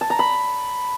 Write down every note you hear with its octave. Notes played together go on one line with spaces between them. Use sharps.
A5
A#5
B5